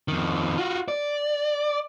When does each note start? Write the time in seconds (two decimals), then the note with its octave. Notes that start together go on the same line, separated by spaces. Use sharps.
0.08 F2 D#3
0.58 F4 F#4
0.88 D5